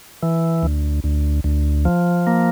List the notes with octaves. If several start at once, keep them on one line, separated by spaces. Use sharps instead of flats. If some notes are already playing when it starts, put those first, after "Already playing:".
E3
D2
D2
D2
F3
A#3